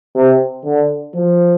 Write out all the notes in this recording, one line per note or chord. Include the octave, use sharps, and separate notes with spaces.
C3
D3
F3